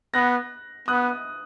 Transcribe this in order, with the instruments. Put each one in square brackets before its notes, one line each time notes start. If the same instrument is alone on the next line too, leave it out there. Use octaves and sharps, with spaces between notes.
[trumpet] B3 [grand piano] F#6 A#6
[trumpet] B3 [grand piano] D#6 F#6